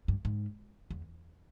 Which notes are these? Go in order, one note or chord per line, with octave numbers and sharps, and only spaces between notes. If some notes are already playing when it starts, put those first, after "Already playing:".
G2
G#2
E2